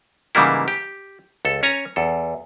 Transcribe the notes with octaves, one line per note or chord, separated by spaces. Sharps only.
G#2 C#3 E3 G3 A#3 E4
G4
C#2 A4
C#4 C#5 G#5 A#5
E2 A4